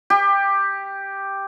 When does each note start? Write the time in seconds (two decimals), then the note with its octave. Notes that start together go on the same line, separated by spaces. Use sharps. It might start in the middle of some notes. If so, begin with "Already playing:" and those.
0.10 G4